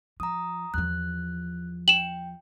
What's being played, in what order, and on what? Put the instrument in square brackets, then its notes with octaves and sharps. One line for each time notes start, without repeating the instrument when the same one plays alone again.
[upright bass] F3 [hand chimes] A#5 D#6
[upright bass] E2 F3 [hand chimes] F#6
[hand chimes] G5 [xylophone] E7 F#7